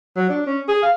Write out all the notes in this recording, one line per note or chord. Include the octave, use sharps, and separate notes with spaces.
F#3
D4
C#4
G#4
F5